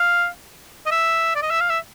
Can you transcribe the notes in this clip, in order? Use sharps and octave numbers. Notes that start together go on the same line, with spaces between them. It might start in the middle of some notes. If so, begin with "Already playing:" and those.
Already playing: F5
D#5
E5
D5
D#5
E5
F5
E5